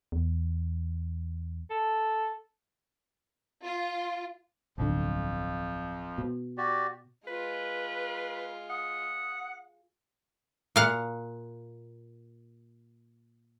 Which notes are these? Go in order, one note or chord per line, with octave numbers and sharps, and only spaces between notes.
E2
A4
F4
D1 B1 F2 D3 F3
B2
F#4 G4 D5
G#3 F4 B4
F#5 D#6
A#2 F5 F#5